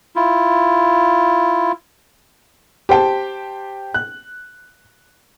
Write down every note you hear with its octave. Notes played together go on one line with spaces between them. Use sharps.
E4 F4
G4 C5 G5 A5
F#6